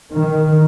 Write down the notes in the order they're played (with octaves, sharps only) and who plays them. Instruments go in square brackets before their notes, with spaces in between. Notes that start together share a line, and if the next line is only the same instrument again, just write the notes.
[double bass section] D#3